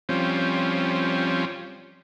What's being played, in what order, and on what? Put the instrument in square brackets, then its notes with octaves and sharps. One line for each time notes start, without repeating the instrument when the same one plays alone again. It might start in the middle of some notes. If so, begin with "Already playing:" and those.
[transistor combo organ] F3 G3 C4 C#4